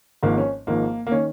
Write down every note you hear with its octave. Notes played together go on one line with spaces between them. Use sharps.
G#1 G#2 F3 A#3
C#4
G#1 G#2 F3 A#3
A#3
D#3 C#4